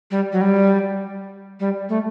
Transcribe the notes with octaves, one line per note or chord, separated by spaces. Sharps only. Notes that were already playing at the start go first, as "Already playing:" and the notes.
G3
F#3
G3
G3
A3